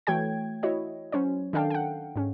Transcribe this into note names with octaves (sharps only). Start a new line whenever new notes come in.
E3 A3 F#4 C#5 G5 G#6
E4 F#4 C#5 D#5
F#3 C#4 C5 C#5
D#3 D4 A4 F5 G5 A5
F#5 G5
G#2 C#4